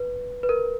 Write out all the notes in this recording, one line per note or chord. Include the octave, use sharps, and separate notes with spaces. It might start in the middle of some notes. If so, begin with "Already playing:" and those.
Already playing: B4
B4
A#4